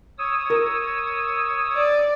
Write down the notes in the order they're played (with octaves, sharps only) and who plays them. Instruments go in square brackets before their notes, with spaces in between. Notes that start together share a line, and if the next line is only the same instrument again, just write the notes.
[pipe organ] C#5 D#6 E6
[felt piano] A#4
[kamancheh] D5